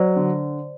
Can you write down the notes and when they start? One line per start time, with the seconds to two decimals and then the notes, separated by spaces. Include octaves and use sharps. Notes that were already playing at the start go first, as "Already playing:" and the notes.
Already playing: F#3 C5 D5
0.16 D3